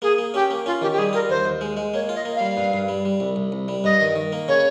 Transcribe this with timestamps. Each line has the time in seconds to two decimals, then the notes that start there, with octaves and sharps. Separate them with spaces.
0.02 A#3 G#4
0.18 A#3
0.34 C#4 G4
0.50 A#3
0.66 C#4 F4
0.82 D#3 G4
0.92 G4
0.98 G3 G#4
1.13 F4 A#4
1.29 D#2 C5
1.45 D#2
1.61 G#3
1.77 G#3
1.93 A#3 C#5
2.09 F4
2.15 D#5
2.25 A#3
2.35 G3 F5
2.57 G2
2.73 G2
2.88 G3
3.05 G3
3.20 C2
3.36 C2
3.52 C2
3.68 G3
3.84 G2 D#5
4.01 D#3
4.16 D#3
4.32 A#3
4.48 C#3 C#5